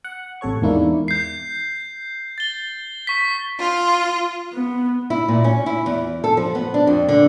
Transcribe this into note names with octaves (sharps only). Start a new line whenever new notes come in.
F#5
A1 C3 A4 C#5 C#6
E2 G#2 D#3 A#3 D4 E4
G6 C7
A6 G7
C#6 B6
F4
B3
E4
A#2
C#4
E4
E2
A4
F3
B3
D4
F2
D3